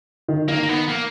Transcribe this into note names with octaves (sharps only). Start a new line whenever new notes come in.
D#3
D#3 A#3
A#3
B3
A#3